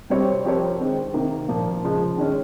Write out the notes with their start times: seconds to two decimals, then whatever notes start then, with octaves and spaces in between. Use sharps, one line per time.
0.10 C3 G3 C4 G4 C#5
0.44 F3 C4 G4 A#4 C#5
0.80 D#3 G#3 C4
1.14 C3 D#3 A#3
1.48 A#2 F3 A#3 F4
1.84 C#3 F3 G#3
2.18 D#3 G#3 C#4